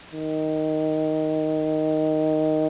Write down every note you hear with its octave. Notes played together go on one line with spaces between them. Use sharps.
D#3